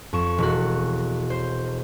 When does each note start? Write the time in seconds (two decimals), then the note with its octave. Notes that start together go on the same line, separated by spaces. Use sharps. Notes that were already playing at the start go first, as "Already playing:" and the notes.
0.13 F2 C#6 E7
0.38 E1 F#4
1.30 C5